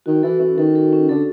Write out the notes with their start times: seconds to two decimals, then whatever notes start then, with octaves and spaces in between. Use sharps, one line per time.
0.06 D#3 F#4
0.23 E3 A4
0.40 E3 C#4
0.58 D#3 A4
0.75 A4
0.93 C#4
1.09 D3 A4